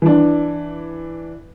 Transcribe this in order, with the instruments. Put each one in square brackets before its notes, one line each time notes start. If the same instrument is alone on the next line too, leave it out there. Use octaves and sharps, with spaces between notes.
[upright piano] E3 D4